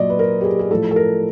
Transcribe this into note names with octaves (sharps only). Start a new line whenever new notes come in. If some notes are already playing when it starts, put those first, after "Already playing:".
Already playing: A#2 F#3 D5 D#5
B4
A#4
G4
G#4
G#4
A2 F3 A4
A4
A#4